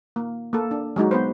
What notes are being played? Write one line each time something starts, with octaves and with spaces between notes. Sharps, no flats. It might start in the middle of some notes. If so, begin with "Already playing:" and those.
A#3
A#3 A4
D4
F#3 G#3 D#4 F#4
B3 B4 C5